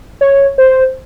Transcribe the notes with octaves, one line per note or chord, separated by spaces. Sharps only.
C#5
C5